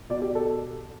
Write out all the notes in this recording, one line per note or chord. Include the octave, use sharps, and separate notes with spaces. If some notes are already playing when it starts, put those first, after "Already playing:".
B2 D5
G4
A4